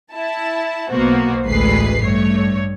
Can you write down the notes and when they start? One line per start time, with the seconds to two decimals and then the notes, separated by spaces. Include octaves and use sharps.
0.12 E4 A5
0.91 B1 B2 A#3 B3 F#4 C5
1.46 A1 D2 G#3 B4 C7
2.02 G2 A3 C#5